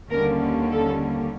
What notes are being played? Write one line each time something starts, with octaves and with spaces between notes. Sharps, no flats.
D#2 D3 G3 A#3 C#4 A#4
A4